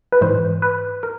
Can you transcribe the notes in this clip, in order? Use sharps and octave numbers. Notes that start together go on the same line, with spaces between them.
B4
G#2 E3 C5
B4
A#4